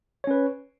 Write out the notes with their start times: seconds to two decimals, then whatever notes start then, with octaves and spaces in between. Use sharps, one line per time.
0.24 C#5
0.27 C#4
0.31 B4